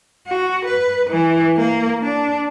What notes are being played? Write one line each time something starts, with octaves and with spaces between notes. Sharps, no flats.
F#4
B4
E3
A#3
D4